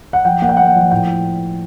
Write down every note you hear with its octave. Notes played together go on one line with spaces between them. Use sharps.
F#5
F3 G5
A#3 F#5
G5
A#3 F#5
F3
A2 G5